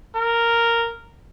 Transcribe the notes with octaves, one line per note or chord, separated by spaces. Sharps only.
A#4